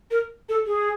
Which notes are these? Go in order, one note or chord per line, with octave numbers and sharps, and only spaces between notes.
A#4
A4
G#4